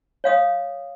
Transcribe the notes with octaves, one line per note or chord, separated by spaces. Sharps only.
C#5 F5 D#6